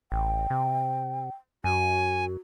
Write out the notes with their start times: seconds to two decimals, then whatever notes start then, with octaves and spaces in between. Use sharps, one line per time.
0.12 A1 G5
0.50 C3
1.64 F#2 F#4 G#5